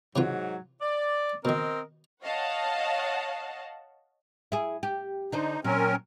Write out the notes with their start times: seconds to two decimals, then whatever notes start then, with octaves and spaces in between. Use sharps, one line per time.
0.16 G#2 C3 E3 F#3 F4
0.81 D5
1.45 B2 D#3 C4 A#4 D#5
2.24 C#5 D#5 F5 F#5 A5
4.52 E4 G#4
4.83 G4
5.32 D3 D4 D#4 C5
5.64 A#2 F#3 C4 C#4 A#4